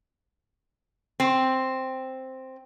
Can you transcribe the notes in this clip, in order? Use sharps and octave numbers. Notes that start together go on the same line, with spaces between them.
C4